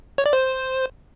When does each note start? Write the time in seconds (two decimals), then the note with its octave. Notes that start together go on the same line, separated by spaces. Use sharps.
0.18 C#5
0.26 D5
0.33 C5